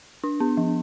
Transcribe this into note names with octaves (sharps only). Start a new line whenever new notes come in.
D4
B3
F3